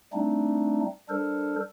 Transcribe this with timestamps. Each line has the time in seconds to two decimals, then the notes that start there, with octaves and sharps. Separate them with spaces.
0.13 G3 A3 C4 D4 D#4
1.09 G3 D4 A4 A#4 C5